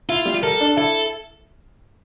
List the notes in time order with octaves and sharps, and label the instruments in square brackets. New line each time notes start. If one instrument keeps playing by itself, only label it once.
[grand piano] E4 [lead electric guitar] F4
[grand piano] G3
[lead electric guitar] A4 [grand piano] A#4
[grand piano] D4
[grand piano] E4 [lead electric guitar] A4